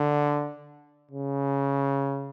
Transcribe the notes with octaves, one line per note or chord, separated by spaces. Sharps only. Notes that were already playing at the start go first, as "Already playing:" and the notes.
Already playing: D3
C#3